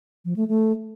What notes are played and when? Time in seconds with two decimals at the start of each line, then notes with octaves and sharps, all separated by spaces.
0.25 F3
0.36 A3
0.48 A3